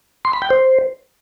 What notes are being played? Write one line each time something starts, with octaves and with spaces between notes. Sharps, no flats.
C6
B5
G5
C5